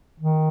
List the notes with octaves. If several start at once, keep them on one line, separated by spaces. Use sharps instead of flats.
D#3